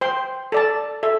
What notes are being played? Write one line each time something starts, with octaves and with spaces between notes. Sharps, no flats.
C5 G5 C6
A4 D5 A5
A4 E5